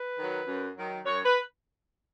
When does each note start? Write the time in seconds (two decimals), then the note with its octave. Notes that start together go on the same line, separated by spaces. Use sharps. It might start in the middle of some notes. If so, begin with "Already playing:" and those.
Already playing: B4
0.17 D#3 F#3
0.47 F#2
0.76 D#3 F#3
1.05 F#2 C#5
1.25 B4